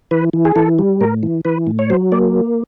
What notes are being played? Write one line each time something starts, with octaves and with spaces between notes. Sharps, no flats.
E3 B4
E3
G#4
E3 A4
G3
A2 A#4
E3
E3 B4
A2
C#5
F#3 C5
A#3 D5